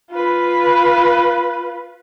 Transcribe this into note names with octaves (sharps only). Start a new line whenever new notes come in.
F4 B4